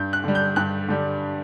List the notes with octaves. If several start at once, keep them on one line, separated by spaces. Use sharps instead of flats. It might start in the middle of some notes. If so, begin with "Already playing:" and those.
Already playing: G2 G6
F#6
D3 G3
G6
G2 F#6
D3 G3